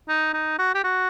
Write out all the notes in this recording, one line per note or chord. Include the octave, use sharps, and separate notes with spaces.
D#4
D#4
F#4
G4
F#4